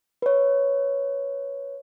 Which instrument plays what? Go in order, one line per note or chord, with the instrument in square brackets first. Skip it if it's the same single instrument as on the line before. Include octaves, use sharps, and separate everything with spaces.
[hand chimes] B4 C#5